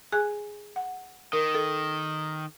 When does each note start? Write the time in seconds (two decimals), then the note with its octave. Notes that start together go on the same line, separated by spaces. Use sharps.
0.12 G#4 G#5 F#6
0.76 F#5
1.33 D#3 A#4
1.55 A4